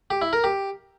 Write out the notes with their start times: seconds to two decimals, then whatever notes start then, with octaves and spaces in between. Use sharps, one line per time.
0.10 G4
0.22 E4
0.33 A#4
0.44 G4